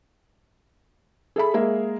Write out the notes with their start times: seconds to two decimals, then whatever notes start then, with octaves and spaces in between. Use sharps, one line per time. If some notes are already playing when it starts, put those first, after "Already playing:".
1.36 G#4 A4 E5 B5
1.54 G#3 A#3 G#4 A#4 E5